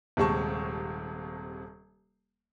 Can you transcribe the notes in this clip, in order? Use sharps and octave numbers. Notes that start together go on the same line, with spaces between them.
D#1 D#2 C3 G#3 A5 C#6